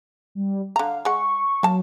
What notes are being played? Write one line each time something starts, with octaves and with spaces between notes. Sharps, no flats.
G3
D3 F5 A#5
G#3 F#5 C#6
F#3 A#3 A5